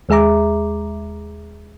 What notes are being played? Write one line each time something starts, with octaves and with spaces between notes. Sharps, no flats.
D#2 G#3 G#4 E5 A#5 D6